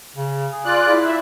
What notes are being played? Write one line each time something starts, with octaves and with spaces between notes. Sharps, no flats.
C#3
G#4
F4 D5 F#6
E4
E5